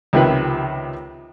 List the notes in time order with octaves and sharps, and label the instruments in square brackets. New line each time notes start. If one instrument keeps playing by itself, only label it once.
[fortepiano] C#2 C3 D#3 F3 B4